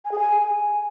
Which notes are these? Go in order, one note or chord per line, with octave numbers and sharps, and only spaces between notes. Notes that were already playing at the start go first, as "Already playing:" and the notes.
G#5
G#4
G#5